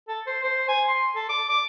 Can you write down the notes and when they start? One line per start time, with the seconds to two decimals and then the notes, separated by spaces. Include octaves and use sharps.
0.08 A4
0.27 C5
0.43 C5
0.68 G#5
0.88 C6
1.15 A4
1.29 D6
1.49 D6